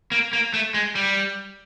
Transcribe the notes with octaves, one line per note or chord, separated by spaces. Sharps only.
A#3
A#3
A3
G#3
G3